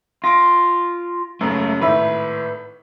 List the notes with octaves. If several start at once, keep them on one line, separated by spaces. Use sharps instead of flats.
F4 A#6 D7
F#2 C#3 A3 A#3
G#1 A2 B4 E5